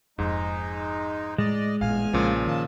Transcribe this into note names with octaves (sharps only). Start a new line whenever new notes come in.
F1 F2 G#2 G#3 D#4
A2 G#3 D5 D#5
A1 E2 A#2 F5 G#5 F6
B1 A#2 C#3 F3
D#3 A5